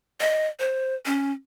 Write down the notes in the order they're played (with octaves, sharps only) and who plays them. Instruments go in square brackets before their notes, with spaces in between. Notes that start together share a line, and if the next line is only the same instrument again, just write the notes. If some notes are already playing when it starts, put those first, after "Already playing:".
[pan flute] D#5
C5
C#4